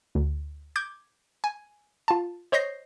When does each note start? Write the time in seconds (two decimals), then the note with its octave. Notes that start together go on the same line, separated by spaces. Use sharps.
0.15 D2
0.76 D6 G6 G#6
1.44 G#5
2.08 F4 A5
2.52 C5 C#5 D#5 G6 A#6 C7